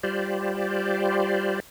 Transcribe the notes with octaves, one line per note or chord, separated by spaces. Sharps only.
G3 F4 G4 C5 D5